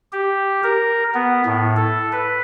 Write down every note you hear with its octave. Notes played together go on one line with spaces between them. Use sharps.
G4
A#4
B3
A2
A4
B4